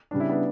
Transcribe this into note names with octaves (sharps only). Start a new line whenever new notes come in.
C#3 G3 B3 D4
E4
B3 D4